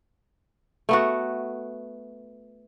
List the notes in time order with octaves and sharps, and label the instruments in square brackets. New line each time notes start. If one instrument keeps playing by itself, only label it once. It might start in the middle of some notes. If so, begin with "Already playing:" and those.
[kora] A3 B3 F#4